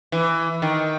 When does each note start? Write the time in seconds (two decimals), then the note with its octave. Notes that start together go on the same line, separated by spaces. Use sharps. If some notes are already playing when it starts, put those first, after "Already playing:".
0.12 E3
0.62 D#3